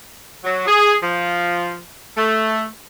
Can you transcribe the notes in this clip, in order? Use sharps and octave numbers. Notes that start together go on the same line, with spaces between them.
F#3
G#4
F3
A3